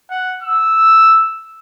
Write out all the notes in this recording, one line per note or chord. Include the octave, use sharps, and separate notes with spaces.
F#5
E6